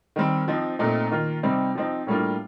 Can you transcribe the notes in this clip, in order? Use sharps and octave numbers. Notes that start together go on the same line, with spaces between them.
D#3 G3 C4
F3 C4 D#4
A#2 A3 C4 D#4
D#3 A#3 F4
C3 G3 C4 D#4
F3 C4 D#4
A2 G3 A#3 D4 F4